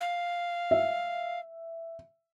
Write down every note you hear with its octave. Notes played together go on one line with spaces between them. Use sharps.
F5
E5